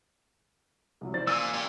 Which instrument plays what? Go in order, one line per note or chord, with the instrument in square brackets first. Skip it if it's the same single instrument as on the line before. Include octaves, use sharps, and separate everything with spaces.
[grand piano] C2 [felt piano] F3 F#3
[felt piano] E3 C5 D5 [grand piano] A6
[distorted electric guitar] A#2 [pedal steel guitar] F5 G#5 E6
[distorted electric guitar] C#4 G4 [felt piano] D5 A#5 C6